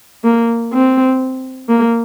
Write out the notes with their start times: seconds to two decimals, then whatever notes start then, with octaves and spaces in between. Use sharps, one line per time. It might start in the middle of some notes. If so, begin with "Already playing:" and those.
0.24 A#3
0.73 C4
1.69 A#3